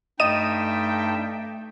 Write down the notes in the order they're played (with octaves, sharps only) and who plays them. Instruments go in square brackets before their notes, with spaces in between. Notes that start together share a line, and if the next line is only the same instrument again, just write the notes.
[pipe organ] G2 D#4 A5 [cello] A3 [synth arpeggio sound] D#5 D#7 E7 [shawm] G5